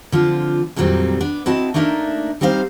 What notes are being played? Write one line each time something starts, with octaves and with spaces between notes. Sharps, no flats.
D3 F3 C4 F4
F2 A#2 D#3 F#3 G3 C4
B3 D4
C4 E4 F#4 D#5 A5
A3 A#3 D4 D#4 A#4 E5
G3 C4 D#4 C5 F5